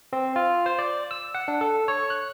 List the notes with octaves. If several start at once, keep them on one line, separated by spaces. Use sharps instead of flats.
C4
F4
C5
D5
E6
F#5
D4
A4
C#5
F#6